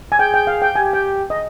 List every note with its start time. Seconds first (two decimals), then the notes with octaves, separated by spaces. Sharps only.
0.12 G#5
0.19 G#4 G5
0.34 G5
0.47 F5
0.62 G5
0.75 G4 G#5
0.93 G5
1.30 D#5